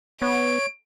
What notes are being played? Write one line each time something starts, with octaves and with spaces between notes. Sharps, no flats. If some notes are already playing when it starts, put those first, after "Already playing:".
B3 C#5 D7